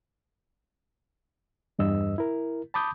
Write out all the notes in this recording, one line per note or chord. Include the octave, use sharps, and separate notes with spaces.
E2 G2 D#5 E6
E4 A#4
A5 B5 D6 D#6 G6